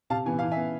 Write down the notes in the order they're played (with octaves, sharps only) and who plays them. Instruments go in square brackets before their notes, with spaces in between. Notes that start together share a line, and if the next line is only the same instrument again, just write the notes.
[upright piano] C3 F5 A5
E3 B3 G#5
E3 F5
E5 G#5
B3